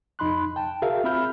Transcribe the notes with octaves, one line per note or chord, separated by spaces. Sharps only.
F2 D#4 B5 C6 F#6
G5 A5
F#4 G#4 A#4 E5 F5
C4 F4 E5 B5 F6 G6